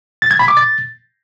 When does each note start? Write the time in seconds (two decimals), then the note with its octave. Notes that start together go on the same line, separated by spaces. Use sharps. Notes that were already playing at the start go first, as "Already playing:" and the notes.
0.22 A6
0.31 G#6
0.39 B5
0.48 D6
0.57 A6